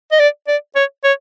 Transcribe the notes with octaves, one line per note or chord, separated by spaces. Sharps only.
D#5
D5
D5
C#5
C#5